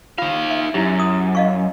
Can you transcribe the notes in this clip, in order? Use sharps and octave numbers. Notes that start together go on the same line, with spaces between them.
D#4 F4 F5
E5
F#2 E4 G4
D#6
D#5 F5 C#6